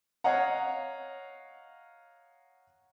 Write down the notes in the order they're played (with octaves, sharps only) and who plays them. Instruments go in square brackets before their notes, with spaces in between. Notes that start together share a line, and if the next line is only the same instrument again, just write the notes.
[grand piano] C#5 D#5 F5 F#5 A#5